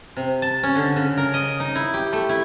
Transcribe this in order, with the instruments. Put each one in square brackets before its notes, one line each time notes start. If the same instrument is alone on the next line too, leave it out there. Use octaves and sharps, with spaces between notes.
[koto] C3
A5
C#4
D3
C#3
A#4
D#5
D#4
E4
G4
A3
E4